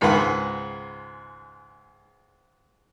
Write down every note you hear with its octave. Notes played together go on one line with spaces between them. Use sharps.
C#2 G#2 D#3 B4 F#5 B5